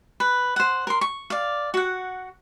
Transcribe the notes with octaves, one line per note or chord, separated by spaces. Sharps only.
B4
C5 F#5
A#4 C6
C#6
D5 F5
F#4 F#5